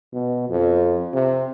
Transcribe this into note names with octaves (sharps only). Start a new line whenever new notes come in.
B2
F2
C3